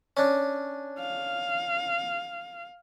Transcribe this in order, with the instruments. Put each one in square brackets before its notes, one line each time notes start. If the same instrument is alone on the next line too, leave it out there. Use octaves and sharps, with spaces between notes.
[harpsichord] C#4 D4
[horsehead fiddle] F5